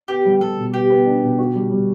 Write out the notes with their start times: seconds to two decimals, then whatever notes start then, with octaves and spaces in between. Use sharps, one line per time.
0.08 B3 G4
0.25 G3
0.41 G3 A4
0.57 B2
0.74 B3 G4
0.90 B3
1.06 D4
1.23 B2
1.39 F#4
1.55 G3
1.71 G3